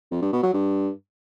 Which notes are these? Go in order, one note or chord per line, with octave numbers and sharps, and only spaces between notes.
F2
G2
B2
F#3
G2